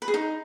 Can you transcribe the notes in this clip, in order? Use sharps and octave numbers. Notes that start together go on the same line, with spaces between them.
B4
G#4
D#4